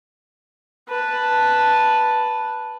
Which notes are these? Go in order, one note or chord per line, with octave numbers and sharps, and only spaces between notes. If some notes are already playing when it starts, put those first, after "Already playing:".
B4 A5